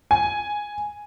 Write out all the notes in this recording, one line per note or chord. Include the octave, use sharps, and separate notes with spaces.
G#5